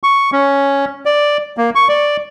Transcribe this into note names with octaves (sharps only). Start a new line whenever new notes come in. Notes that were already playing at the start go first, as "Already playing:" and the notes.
C#6
C#4
D5
A#3
C#6
D5